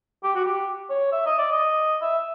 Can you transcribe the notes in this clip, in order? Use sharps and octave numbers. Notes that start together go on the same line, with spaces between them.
G4
F#4
G4
C#5
E5
D#5
D5
D#5
E5